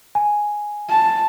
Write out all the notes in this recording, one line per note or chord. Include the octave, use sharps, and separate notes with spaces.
G#5
A5